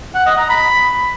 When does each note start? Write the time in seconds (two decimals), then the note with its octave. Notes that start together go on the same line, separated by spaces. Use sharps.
0.15 F#5
0.26 D#5
0.38 A#5
0.50 B5